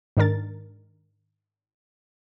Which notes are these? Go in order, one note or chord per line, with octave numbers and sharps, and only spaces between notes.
G#2 D#3 D4 A#4 A6